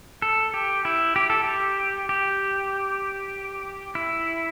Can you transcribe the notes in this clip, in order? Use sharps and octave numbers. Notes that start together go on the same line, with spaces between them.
A4
G4
E4
G4
A4
G4
G4
E4